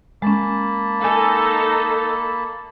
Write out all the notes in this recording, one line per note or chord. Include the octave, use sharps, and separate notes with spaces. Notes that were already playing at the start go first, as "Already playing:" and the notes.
G#3 A#3 C#4 A5 B5
D#4 A4 F5 G#5